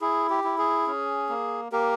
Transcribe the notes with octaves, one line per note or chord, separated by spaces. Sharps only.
E4 G#4
G4
E4
G#4
C#4
A#3
A#3 G4 A#4